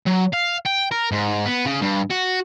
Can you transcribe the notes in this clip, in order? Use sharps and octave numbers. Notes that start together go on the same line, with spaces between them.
F#3
F5
G5
A#4
G#2
B3
C#3
G2
F#4